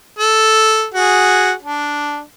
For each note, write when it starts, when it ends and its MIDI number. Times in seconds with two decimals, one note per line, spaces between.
0.19 0.88 69
0.95 1.53 66
0.95 1.53 68
1.62 2.20 62